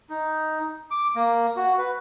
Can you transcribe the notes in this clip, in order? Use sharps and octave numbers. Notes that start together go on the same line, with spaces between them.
D#4
D6
A#3
F#4
B4